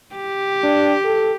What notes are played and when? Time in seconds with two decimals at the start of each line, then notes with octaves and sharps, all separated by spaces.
0.15 G4
0.64 D4
1.05 A4